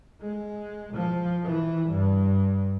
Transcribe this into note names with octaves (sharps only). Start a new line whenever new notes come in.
G#3
F3
E3
G2